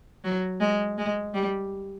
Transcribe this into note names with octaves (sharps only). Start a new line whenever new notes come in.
F#3
G#3
G#3
G3